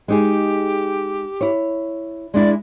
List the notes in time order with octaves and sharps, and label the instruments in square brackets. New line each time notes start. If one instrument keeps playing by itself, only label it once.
[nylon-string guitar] G#3 D#4 G#4 [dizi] G4
[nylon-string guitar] E4 C#5
[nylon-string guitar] G#3 D4 E4 [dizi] D5